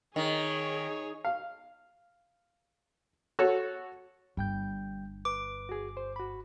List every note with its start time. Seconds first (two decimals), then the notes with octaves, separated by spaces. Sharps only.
0.16 D#3 G#4 C#5
1.25 F5
3.39 F#4 A4 C#5
4.37 G1 G3 G5 G6
5.25 B4 D6
5.69 F#4 G#4
5.97 C5
6.16 F#4 B5